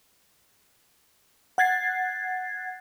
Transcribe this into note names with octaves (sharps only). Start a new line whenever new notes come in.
F#5 F#6 G#6 A6 C7